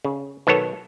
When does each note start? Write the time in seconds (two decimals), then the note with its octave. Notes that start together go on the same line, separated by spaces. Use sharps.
0.05 C#3
0.47 B2 D#3 F#3 B3 A4 C#5